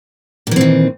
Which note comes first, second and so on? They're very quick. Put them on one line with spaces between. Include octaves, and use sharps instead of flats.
A#2 E3 C4 D#3